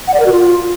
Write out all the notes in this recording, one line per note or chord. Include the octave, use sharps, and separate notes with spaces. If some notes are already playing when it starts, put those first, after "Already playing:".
F#5
D5
A#4
F#4
F4